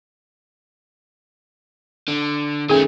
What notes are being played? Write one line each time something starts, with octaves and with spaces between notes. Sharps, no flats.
D3
D#3 A3 C#4 G#4